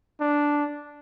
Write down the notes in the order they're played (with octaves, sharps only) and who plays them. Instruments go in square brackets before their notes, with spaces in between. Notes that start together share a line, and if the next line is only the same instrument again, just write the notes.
[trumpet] D4